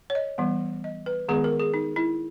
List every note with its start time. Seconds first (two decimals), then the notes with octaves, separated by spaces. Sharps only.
0.10 C#5
0.15 D#5
0.38 E3 G3 B3
0.84 D#5
1.06 B4
1.29 D#3 G#3 B3 G#4
1.44 A#4
1.60 G#4
1.74 D#4
1.96 E4